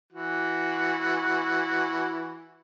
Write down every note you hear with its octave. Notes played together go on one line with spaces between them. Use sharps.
E3 F#4